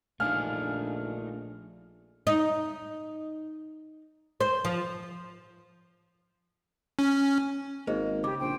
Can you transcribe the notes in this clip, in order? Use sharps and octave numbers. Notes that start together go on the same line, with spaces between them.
A#1 A3 D4 D#4 F5 G#5 F6
D#4
C5
F3
C#4
G#1 A#3 G#4 C5 D#5
C#3 G4 D6
A#1 C5 G5